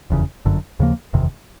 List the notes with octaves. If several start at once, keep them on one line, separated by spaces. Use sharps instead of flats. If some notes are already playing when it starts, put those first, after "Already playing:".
F1 E2 C#3
G1 F#2 D3
D#2 C#3 F3 A#3
F#1 E2 C3 D#3